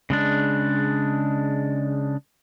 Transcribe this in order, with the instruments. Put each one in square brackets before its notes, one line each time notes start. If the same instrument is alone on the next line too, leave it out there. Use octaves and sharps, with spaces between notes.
[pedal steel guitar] C#3 G#3 D4